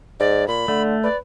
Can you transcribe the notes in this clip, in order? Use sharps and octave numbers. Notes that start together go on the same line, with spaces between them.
G#2 D5
A#2 B5
D3 A3
B4 D5